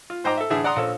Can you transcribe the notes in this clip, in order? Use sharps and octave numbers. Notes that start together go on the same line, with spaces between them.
F4
G#2 C5 D#5 G5 A#5 D6
A4 E5
A2 D3 E3 G#4 E5
D5 F#5 A#5 C6 D#6
A#1 A4 C#5